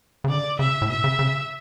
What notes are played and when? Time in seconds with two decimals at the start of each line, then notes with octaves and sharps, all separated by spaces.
0.24 C#3
0.29 D3 D5
0.59 C#3 E5
0.82 A2
0.89 B2 E5
1.04 C#3
1.19 C#3